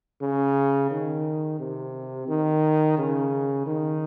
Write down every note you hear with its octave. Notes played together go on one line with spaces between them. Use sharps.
C#3
D#3
C3
D#3
C#3
D#3